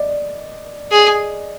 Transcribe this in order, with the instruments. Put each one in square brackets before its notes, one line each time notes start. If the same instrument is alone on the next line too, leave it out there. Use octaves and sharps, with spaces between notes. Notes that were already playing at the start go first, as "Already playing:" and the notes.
Already playing: [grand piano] D5 D#5
[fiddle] G#4